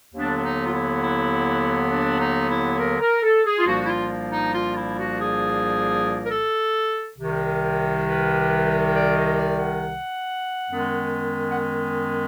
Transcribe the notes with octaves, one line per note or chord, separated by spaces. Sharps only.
D#2 D3 F#3 B3 D4
D4
D#4
F4
E4
E4
D4
D#4
E4
A#4
A#4
A4
G#4
F4
C2 A#2 F3 A#3 D4 F#4
E4
F4
D#4
F4
E4
F#4
G#4
A#4
A4
C2 C3 D#3
B4
D5
D#5
D5
F#5
F#2 D#3 G#3 B3
F#5